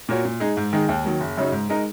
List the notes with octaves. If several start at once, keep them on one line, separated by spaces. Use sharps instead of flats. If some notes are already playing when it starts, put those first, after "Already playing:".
A#2 A#3 F#4 C#5
A#2
G#3 D#4 G#4
G#2
D#3 G#3 D#4 G#4
D#2
D#3 F#3 A#3
F#1
F#2 C#3 F#3 D#4
G#2
G#3 D#4 A#4